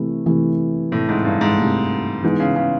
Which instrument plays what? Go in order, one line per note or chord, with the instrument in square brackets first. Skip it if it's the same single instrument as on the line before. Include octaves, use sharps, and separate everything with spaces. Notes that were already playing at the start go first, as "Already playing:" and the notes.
Already playing: [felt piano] C3 E3 A3
C3 E3 A3
[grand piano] A2 [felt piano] C3 E3 A3
[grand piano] G#2
G2
G#2
[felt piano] C3 E3 A3
[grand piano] G#2 [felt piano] E3 G#3 B3 D#4
[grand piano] C#3
C#3